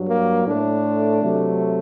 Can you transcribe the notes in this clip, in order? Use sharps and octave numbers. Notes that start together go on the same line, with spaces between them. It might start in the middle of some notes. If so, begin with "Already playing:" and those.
Already playing: G2 F#3
A#3
A2 A3 D4
C3 F#3 A3